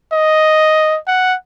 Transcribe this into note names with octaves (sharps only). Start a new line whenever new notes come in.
D#5
F#5